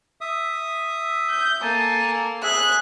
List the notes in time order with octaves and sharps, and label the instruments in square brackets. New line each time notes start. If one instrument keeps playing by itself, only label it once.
[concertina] E5 D#6
[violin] G6
[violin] A#3 A4 [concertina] G#5 A5
[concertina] G#4 E5 [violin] F#6